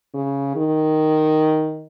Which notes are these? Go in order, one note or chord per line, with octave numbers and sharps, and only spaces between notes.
C#3
D#3